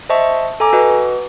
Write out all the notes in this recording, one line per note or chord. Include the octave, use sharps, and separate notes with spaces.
C5 D#5 E5 A5 C#6
A4 G#5 A#5 D6
F#4 B4 D#5